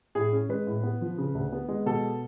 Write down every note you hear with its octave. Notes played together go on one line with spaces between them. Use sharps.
A2 G#4
C#4
G#3 B4
A2
B3
F3
C#3
D2
B3
G#3
B2 A4